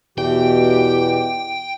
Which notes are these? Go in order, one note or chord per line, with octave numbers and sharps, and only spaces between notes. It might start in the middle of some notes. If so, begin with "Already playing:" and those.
E2 B2 E3 G4 G5